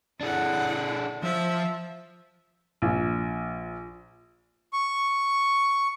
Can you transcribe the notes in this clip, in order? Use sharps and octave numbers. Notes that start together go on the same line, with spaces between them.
D4 E4 G#4 A4 F#5
F3 C5 E5
A#1
C#6